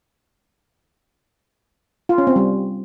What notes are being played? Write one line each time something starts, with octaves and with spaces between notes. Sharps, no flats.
F4
C#4
C4
G3